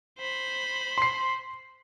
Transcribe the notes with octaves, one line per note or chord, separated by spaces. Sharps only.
C5 B5
C6 C7